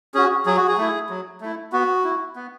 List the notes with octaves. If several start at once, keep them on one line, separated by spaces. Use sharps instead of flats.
C#4 F#4 G#4
F#3 G#4
F#4
G#4
A3 E4
F#3
A3 E4
B3 F#4
E4
B3